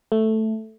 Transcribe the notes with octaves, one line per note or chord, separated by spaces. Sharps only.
A3